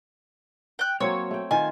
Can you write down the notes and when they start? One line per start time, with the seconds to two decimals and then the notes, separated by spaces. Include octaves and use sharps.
0.79 G5 F#6
1.00 F#3 A#3 C4 C#5
1.31 A3 G5
1.51 D#3 F4 C5 G#5